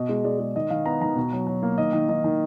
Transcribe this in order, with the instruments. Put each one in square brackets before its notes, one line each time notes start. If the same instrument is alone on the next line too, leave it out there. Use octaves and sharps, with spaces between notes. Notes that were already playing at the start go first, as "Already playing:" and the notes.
Already playing: [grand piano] B2 D#5
G#3
G#3 D5
G#3
D#3 D#5
D#3 F5
B3 A#5
D#3 A#5
B2
F#3
F#3
A#3
D#3 D#5
D#3
D#3 D#5
D#3